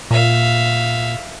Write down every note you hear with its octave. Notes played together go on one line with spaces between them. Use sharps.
A#2 E5 F5